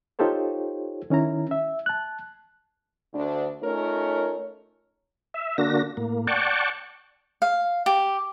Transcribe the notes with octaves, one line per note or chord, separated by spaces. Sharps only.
D#4 F4 G4 A4 C5 C#5
D#3 C#4 E4 A#5
E5
A5 F#6
D2 D4
A3 C#4 D#4 F4 A#4 C#5
E5
D3 A#3 D4 F#4 A#6
A2 A#3
D5 F#5 G5 A5 C#6
F5
G4